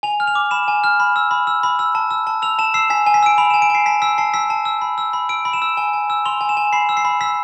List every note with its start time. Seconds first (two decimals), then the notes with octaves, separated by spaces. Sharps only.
0.03 G#5 F7
0.20 F6
0.27 F7
0.35 D6
0.51 B5 E7
0.68 G#5
0.84 F6
1.00 B5
1.16 E6
1.31 B5
1.47 E6
1.63 B5
1.79 E6
1.95 A5
2.11 E6
2.27 A5
2.42 E6 F7
2.59 A5 E7
2.74 E6 C7
2.90 G#5 B6
3.06 G#5
3.14 B6
3.23 E6 D7
3.38 B5 F7
3.50 E7
3.54 G#5
3.62 D7
3.70 G#5 C7
3.86 A5 B6
4.02 E6 B6
4.18 A5 C7
4.34 E6 B6
4.50 A5
4.65 E6
4.82 B5
4.98 E6
5.13 B5
5.29 E6 D7
5.45 B5
5.53 E7
5.62 E6
5.77 G#5
5.93 G#5
6.10 E6
6.25 C6 F7
6.41 G#5
6.49 E7
6.57 G#5
6.73 B5 C7
6.89 E6
6.97 C7
7.05 B5
7.21 E6 B6